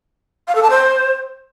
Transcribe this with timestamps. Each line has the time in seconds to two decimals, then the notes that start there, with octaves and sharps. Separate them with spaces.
0.48 F5
0.55 A4
0.63 A5
0.70 C5